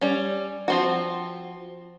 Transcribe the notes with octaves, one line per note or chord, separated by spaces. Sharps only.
G3 C#4
F3 C4 F#4